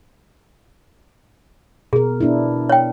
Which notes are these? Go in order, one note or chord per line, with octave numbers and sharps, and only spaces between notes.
B2 G#4 A#4
B3 D4 E4
C#5 G5